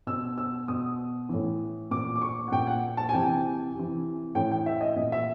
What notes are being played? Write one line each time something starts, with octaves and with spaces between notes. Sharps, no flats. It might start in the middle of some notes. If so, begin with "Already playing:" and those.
B2 E6
E6
B2 D#6
A2 E3
A#2 D6
D6
C#6
F#5
A#2 G5
F#5
A5
G#5
C3 E3 G5
C3
E3
A2 E3 G5
G5
E5
D#5
A#2 D#5
E5